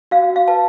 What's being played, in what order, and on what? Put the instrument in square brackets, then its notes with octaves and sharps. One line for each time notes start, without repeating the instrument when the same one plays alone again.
[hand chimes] F#4 [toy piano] F5
[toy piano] F5
[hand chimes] B4 F5 A5